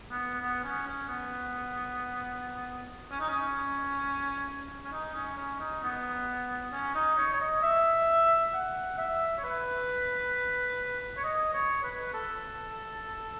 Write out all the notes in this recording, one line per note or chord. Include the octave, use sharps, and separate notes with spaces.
B3
B3
C#4
C#4
B3
C#4
D#4
C#4
C#4
D#4
C#4
C#4
D#4
B3
C#4
D#4
C#5
C#5
D#5
E5
F#5
E5
C#5
B4
C#5
D#5
C#5
B4
A4